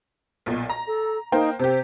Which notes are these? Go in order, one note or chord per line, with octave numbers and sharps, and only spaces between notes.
B1 A#2
A#5
A4
A#3 D#4 C5 G5
C3 G4 C5